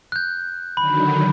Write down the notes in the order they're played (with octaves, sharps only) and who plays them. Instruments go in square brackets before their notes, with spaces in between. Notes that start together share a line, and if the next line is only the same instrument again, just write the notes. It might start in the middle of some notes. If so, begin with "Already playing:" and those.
[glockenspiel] F#6 G6
[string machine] D3 D#3 F#3 [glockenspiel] B5